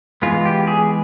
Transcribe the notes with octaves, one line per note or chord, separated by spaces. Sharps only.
E3 G#3 B3 F4
G4
G#4